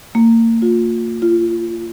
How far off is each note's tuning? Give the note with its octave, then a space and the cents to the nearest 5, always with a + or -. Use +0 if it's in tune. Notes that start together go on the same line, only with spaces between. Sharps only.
A#3 -35
F4 +25
F4 -25